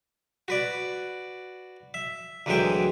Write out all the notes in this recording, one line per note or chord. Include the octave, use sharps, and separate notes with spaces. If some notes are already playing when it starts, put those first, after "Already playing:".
F#4 B4 D5
E5
D2 E3 F#3 G#3 E5 G5